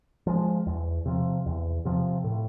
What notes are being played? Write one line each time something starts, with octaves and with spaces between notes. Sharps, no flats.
F3 G#3
E2
C3 F3
E2
C3 F3
A2